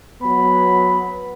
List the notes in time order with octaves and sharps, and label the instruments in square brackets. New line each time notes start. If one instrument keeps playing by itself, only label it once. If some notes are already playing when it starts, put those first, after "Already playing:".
[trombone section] F#3 B3 [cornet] B5